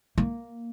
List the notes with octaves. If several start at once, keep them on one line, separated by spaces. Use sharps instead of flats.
A#3